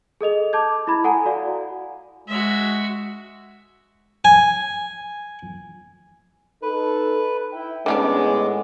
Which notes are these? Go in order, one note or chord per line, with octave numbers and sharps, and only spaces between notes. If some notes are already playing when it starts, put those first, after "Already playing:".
G#4 A4 D#5 F7
A5 D6 G6 G#6
E4 B5 G#6
A4 F#5 G#5 A#5
F#4 D5 F5
G#3 F#4 E5
G#5
D#4 A4 B4
E4 E5 G5
A2 D#3 G#3 B3 C#4 D4 D6